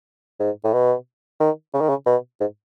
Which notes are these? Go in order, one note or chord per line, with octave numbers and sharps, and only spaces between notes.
G#2
A2
B2
D#3
C#3
D#3
C#3
B2
G#2